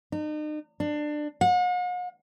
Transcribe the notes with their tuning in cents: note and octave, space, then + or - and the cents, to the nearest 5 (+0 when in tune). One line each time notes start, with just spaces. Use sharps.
D#4 -40
D4 +20
F#5 -45